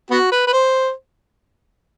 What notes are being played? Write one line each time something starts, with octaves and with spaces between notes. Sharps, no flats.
B3 F#4
B4
B4
C5